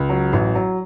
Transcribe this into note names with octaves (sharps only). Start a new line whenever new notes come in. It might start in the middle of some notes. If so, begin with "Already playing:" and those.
Already playing: C#2
F#3
A1
F#3